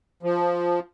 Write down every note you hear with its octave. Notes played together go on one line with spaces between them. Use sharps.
F3